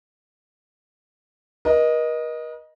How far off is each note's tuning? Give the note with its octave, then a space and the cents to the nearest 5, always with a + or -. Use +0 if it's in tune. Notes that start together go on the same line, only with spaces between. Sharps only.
A#4 +45 D#5 +0